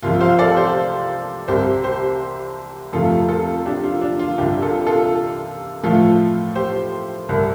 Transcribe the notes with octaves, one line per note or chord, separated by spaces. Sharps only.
C2 C3 F3 F4
C5 F5
A4 D5
G4 C5
C2 C3 G3 G4 C5
G4 C5
F2 C3 F3 A3 F4 A4
F4 A4
D4 G4
F4
D4
F4
C2 C3 G3 D4 G4
F4 A4
F4 A4
A2 F3 A3 F4 A4
G4 C5
C2 C3 G3